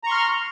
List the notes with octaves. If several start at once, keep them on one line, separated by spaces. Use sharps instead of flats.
A#5 C6 C#6 F6